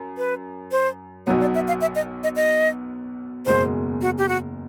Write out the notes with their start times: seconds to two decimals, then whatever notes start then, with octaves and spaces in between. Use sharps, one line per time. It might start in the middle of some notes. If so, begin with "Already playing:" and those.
Already playing: F#2
0.17 B4
0.71 C5
1.26 B1 B2 F#3 B3 C#5
1.41 D5
1.55 E5
1.68 F5
1.81 E5
1.95 D#5
2.23 D#5
2.36 D#5
3.46 F#1 E2 B2 G#3 C5
4.02 F#4
4.18 G4
4.28 F#4